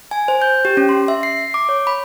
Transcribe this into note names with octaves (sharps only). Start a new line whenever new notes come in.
G#5
C5
G6
G4
C#4
C6
E5
C7
D6
C#5
B5